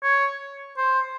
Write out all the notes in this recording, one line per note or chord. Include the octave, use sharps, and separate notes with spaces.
C#5
C5